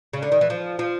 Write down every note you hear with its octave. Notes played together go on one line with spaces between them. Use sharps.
C#3
D3
D#3
E3
F3
F3